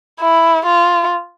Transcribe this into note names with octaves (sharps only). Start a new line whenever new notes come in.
E4
F4